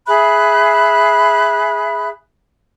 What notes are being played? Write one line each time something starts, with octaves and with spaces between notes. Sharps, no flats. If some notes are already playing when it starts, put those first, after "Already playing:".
G#4 E5 B5 F#6